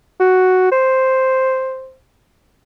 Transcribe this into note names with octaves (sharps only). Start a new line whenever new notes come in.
F#4
C5